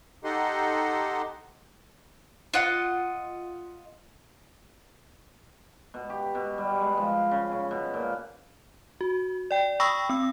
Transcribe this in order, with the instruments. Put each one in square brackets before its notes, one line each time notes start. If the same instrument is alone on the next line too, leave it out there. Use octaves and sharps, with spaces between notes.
[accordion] D#4 G4 A4 D#5 F#5 C6
[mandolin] F4 D#5 F#5
[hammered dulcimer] B2
G4
B2
G3
G#3
F3
C#3
C#3
B2
A#2
[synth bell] F#4
D5 G5
G5 B5 C#6 D#6 E6 A#6
C4 E6